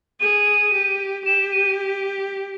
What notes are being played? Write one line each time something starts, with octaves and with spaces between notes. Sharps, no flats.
G#4 D#7
G4
G4 E7
D#7